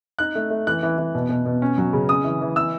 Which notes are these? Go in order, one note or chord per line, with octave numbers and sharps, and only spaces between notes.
D#4 F#6
A3
A3
E3 F#6
E3
E3
B2
B2
B2
C#4
F#3
C#3
C#4 D#6
E3
E3
E3 E6